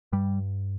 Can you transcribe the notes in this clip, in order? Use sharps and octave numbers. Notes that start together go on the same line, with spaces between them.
G2 G3